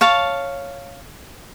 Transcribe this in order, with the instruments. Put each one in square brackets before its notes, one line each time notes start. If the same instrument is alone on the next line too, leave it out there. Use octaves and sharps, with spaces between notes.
[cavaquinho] C#5 F5 A5